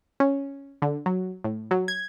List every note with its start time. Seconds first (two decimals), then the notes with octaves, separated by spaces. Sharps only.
0.20 C#4
0.82 D3
1.06 F#3
1.44 A2
1.71 F#3
1.88 G#6